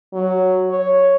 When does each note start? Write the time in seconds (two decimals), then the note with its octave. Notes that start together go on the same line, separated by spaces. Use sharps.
0.13 F#3
0.71 C#5